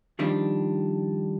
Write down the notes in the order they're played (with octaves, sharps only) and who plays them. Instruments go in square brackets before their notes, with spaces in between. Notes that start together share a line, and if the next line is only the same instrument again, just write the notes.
[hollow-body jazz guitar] D#3 F3 G3 D4